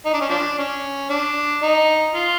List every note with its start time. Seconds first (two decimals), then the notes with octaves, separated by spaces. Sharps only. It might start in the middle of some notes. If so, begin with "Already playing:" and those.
0.06 D#4
0.14 D4
0.21 C#4
0.29 F3 D4
0.58 C#4
1.10 D4
1.63 D#4
2.15 F4